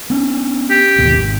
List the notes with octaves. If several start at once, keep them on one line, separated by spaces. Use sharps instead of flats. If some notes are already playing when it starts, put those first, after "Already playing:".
B3 C#4 D4
G4
G#1 D#2 B2
G#1